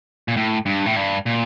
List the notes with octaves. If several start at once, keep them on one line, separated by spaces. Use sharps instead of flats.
A#2
A2
G2
A2
G2
A#2